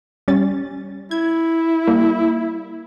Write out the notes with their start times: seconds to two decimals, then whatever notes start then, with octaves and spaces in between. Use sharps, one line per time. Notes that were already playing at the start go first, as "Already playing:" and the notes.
0.28 G3 C#4 A6
1.11 E4 G#6
1.87 G3 A#3